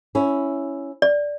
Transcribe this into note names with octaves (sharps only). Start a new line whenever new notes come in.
C#4 E4
D5